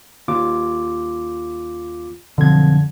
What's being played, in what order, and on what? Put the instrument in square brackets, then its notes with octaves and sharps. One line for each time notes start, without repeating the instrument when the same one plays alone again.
[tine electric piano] D#2 F4 D6
[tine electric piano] B1 F2 G#6 [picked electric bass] D3 F3